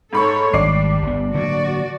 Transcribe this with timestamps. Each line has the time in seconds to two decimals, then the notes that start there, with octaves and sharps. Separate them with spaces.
0.13 G#2 A4 C#5 B5 C#6
0.53 G#1 G3 D4 D6 C7
1.03 G1 B3
1.34 D3 F#3 A#3 F#4 D5